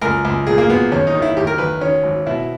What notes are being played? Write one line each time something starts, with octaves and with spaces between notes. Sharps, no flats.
C#2 A#4
C#2
A#2 G#4
A#3
A#2 B3
D#2 C#4
D#4
D#3
E4
D#2 G4
A#4
D#2 B4
D#3 C#4
G#1
B2 E4